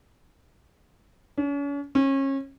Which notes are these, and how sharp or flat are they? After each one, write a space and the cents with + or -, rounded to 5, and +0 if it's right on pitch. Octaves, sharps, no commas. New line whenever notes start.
C#4 +40
C#4 -30